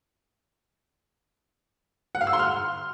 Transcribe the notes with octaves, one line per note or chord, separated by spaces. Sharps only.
F#5
F5
E6
C6
F6